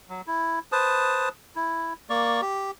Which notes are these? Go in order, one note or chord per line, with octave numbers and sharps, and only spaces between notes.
F#3
E4
B4 C5 A5 D#6
E4
A#3 D5 C#6
G4